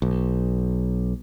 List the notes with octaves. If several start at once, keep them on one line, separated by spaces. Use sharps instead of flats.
B1